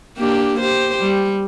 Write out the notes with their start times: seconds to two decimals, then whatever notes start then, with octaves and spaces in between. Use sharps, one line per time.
0.18 A#3 D4 G4
0.60 G4 C5
1.00 G3